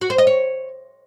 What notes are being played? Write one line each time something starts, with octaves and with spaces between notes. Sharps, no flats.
F#4
C5
D#5
C#5